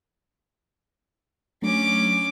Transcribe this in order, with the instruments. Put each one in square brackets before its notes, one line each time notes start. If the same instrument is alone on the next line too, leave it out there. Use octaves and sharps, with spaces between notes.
[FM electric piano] F#3 A3 D4 [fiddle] C#4 D6